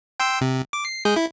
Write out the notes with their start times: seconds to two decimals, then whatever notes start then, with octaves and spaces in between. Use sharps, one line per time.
0.20 G5 C6 E6
0.41 C3
0.73 D6
0.85 C7
1.05 G#3 G#4 G6
1.16 E4